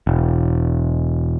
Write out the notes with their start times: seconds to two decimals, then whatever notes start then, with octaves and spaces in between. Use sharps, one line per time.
0.07 E1